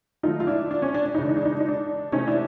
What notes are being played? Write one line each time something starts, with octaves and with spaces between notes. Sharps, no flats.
D#3 F#3 A3 D#4 F4
F4
D4 E4
D4
C#4
D4
D4
D#4
C#3 E3 G#3 D4
D#4
D4
D#4
D4
D#4
D4
C3 E3 A3 C#4 D#4
D4 E4